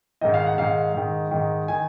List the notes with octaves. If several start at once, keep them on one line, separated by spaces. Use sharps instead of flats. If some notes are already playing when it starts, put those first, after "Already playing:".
G#2 D#3 D#5
F5
F#5
G#2 D#3 F5
G#2 D#3
G#2 D#3
D#3 G#5